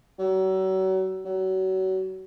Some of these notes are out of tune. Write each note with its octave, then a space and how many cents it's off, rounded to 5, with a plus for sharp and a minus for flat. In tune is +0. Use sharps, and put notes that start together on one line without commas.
F#3 +35
F#3 +30